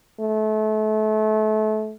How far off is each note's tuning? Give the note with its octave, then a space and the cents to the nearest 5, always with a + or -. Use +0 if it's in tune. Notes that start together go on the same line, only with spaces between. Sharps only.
A3 -30